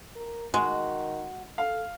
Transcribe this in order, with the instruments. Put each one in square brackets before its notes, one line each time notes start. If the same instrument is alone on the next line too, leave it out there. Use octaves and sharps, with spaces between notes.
[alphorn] A#4
[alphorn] D#3 [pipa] G#3 [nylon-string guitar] F#4
[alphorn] A4 [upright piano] F5